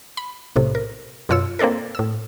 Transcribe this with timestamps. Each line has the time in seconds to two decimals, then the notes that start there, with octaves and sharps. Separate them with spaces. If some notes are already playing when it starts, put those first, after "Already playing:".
0.17 B5
0.56 B1 A2 C3
0.75 A#4
1.29 F#2 B2 F4 C#5 E6
1.59 A#3 C4 D4 A4 A#4
1.95 A2 E6